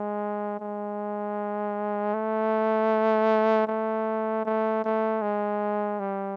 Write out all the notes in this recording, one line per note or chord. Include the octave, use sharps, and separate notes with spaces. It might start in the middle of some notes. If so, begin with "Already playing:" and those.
Already playing: G#3
G#3
A3
A3
A3
A3
G#3
G3